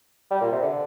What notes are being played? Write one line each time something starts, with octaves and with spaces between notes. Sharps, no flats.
G3
A#2
C3
D3